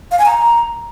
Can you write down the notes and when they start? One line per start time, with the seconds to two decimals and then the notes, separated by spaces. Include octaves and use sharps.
0.11 F5
0.19 G#5
0.26 A#5